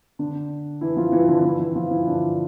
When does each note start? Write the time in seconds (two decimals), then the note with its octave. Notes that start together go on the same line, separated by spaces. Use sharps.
0.19 D3 D4
0.81 E3 E4
0.97 F3 F4
1.12 E3 E4
1.28 D3 D4
1.44 E3 E4
1.59 E3 E4
1.75 F3 F4
1.90 E3 E4
2.07 D3 D4